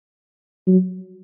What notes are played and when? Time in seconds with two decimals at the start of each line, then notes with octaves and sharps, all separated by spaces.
0.66 F#3